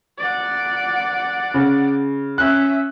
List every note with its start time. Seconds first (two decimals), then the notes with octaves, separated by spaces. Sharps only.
0.19 D5 F#5
1.54 C#3
2.38 C#4 E5 F#6